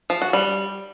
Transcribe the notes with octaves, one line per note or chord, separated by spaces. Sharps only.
F3
F#4
G3